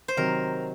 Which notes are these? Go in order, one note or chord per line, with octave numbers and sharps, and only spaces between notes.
C5
C3 D#3 F#3 A#4